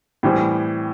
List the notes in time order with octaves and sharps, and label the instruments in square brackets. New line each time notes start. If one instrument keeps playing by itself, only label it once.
[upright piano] A2 E3 G3 C4